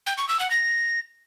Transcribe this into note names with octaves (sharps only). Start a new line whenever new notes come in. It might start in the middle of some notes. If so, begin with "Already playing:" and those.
G5
C#6
E6
F#5
A#6